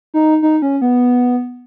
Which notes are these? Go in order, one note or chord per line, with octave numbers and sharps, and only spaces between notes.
D#4
D#4
C#4
B3